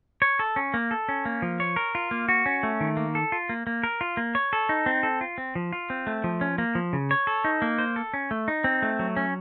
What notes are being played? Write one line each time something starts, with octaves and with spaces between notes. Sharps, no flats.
C#5
A4
C#4
A#3
A4
C#4
A#3
F3
C#5
A#4
F4
A#3
F#4
C#4
A3
D#3
A#3
A4
F4
A#3
A#3
A#4
F4
A#3
C#5
A4
D#4
C4
A4
F4
C4
F3
F4
C4
A3
F3
C#4
A#3
F3
C#3
C#5
A4
D#4
A#3
C5
A4
C#4
A3
D#4
C4
A3
F#3
C#4